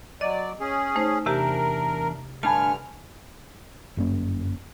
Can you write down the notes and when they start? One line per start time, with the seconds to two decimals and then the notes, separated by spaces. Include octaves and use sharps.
0.21 F#3 D5 D#5
0.60 C#4 G#4
0.96 A3 D#4 C5
1.26 E2 C3 D4 G4 A#4 E5
2.43 G2 D3 A3 D4 G#5 A5 B5 F6
3.97 G1 F#2 A#3 C#4